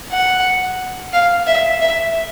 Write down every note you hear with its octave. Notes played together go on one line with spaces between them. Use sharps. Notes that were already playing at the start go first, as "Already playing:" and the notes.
F#5
F5
E5
E5